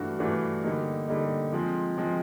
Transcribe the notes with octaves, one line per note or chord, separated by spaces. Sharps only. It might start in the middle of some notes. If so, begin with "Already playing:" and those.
Already playing: G2 E3 A3 D4 F#4
G2 E3 A3 D4 F#4
D3 G3 A#3 D#4
D3 G3 A#3 D#4
F3 G#3 C4
F3 G#3 C4